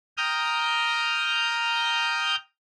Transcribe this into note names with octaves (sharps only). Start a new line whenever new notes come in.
G5 A#5 D#6 F6 G6